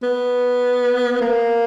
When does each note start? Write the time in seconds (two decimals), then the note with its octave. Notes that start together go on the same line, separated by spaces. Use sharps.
0.03 B3
1.21 A#3